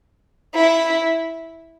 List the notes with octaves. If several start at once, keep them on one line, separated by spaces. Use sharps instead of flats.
E4